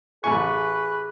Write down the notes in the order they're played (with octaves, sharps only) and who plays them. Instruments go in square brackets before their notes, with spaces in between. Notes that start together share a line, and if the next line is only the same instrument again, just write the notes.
[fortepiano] A1 A3 G#5 [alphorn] G#4 [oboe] B4 [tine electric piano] C#6